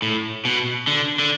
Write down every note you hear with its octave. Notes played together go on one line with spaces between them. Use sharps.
A2
B2
D3
D3